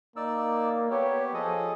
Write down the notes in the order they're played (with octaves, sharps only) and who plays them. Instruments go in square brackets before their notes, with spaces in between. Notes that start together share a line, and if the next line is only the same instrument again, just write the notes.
[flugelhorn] A#3 [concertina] D#4 D5 E6
[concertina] B3 G4 [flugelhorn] C#5
[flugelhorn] F3 [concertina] G#4 A4 D#5